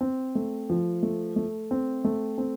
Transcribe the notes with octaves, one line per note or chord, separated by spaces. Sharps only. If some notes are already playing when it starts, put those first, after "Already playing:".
C4
A3
F3
A3
A3
C4
A3
C4